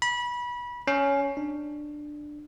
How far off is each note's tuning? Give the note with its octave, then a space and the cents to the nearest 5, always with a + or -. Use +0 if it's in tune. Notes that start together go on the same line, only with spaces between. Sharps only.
B5 -25
C#4 +10
D4 +15